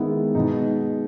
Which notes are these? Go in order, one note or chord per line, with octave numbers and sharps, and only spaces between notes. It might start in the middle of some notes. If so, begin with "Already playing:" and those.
Already playing: D#3 G#3 B3 E4
B2 G#3 B3 D#4